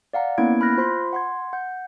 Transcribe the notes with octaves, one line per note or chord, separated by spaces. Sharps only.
D5 F5 F#5 A#5
A#3 B3 C#4 E4 G#6 D7
B5 F6 F#6 A#6
F4 C5 B5 C6
F#5 C6 G#6
F#5 G6